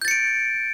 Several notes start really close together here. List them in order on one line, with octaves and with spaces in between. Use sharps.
G6 A6 C#7 D7